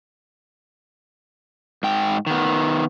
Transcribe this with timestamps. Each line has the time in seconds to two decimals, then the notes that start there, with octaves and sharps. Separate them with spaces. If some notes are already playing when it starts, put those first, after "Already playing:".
1.83 G#2 G5
2.27 D#3 B3